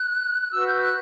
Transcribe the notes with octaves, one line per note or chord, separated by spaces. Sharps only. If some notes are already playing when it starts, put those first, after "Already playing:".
Already playing: F#6
F#6
F#4 B4 E6
G6
F#6